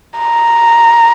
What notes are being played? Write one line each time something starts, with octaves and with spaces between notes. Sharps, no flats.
A#5